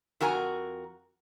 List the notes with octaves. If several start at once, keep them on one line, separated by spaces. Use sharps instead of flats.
F2 F#4 A#4 G#5